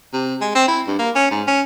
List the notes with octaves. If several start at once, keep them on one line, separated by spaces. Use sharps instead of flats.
C3
G#3
C4
E4
G2
A#3
C#4
G#2
C#4